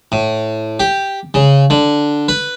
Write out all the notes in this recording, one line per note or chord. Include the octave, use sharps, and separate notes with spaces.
A2
G4
C#3
D3
B4